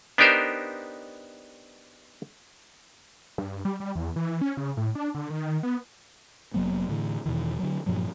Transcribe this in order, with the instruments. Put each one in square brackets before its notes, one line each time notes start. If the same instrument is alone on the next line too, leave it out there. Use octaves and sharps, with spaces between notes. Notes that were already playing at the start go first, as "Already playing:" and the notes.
[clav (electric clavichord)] B3 D4 D#4 G4 A#4 C5
[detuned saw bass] G2
G3
G3
E2
E3
C#4
C#3
A2
D4
D3
D#3
B3
[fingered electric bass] F1 F#3 A#3 B3
A2 D3 E3
E2 B2 D#3 E3
D3 F#3
G2 A#2 F3 F#3